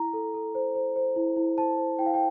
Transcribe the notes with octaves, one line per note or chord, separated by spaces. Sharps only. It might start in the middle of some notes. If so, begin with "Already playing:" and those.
Already playing: E4 A#5
A4
A4
C5
C5
C5
E4
E4
C5 A5
C5
E4 G5
F5
G5